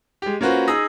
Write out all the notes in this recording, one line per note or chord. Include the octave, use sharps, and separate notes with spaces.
G#3 G4
A#3 C#4 F4 F#4 B4 C5
D#4 G#4 D#6 E6 A#6